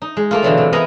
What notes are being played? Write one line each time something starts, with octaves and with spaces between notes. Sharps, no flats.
D#4
G#3
A3 A#3 F4
B2 D3 E3 F#3
C3
B3 A#4 D#5 F5 G#5 A#5